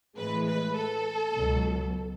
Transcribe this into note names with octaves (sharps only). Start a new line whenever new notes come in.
A2 E3 G#3 B4
B4
A4
C#2 B2 F#3